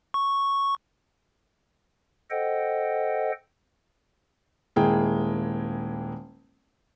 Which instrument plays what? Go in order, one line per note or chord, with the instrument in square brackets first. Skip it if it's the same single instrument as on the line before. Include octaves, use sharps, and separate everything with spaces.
[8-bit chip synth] C#6
[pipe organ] A4 C5 D#5 F#5 G5
[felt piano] D#1 G#3 A#3 E4 G#4 G5